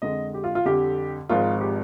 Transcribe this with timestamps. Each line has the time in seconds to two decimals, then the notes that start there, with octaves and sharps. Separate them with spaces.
0.02 F2 D3 G#3 D#5
0.34 G4
0.44 F4
0.55 F4
0.65 F2 D3 G3 G4
1.29 G#1 G#2 F3 G#3 F4
1.61 G4